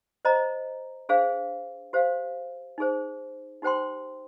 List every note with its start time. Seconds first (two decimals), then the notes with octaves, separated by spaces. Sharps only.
0.25 C5 D#5 A#5
1.09 D4 G#4 C5 F5
1.93 G4 C5 F5
2.78 D#4 G#4 C5
3.62 D#4 G4 C5 G5 C6